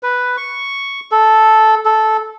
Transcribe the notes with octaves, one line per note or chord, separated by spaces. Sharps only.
B4
C#6
A4
A4